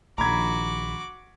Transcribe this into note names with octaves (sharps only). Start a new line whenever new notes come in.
A#1 D#3 F#4 A#5 B5 D6 G#6